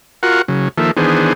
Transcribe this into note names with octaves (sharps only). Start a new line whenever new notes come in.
F4 F#4 A#4 F#5
C#3 F#3
D#3 F3 A#3 A4 E5
D#3 E3 B3 D4 G#4 C5